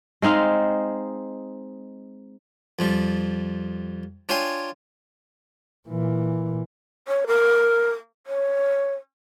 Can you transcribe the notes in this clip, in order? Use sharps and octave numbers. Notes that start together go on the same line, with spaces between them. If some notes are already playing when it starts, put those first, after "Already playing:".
G#3 C4 D#4 F5
F2 F3 G3
D4 F4 C#5 G5 G#5 C6
A#2 E3
C#5
A#4
C#5